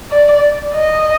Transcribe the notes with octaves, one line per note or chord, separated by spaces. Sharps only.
D5
D#5